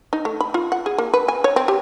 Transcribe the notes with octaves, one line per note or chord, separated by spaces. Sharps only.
D#4
A3
B5
F4
F#5
G#4
A#3
B4
G#5
C#5
C4
G4